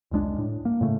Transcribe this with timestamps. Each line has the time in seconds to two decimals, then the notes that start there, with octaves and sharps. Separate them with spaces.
0.11 F1 C#2 G#3 D4
0.38 A2
0.65 A#3
0.81 A2 C#3 A3